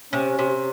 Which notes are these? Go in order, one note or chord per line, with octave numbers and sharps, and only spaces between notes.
C3 C#4
C3